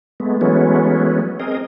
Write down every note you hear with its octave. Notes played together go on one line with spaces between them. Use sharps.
G#3 A3 B3
E3 F#3 G#3 A3 B3 C#4
C4 G#4 A#4 D#5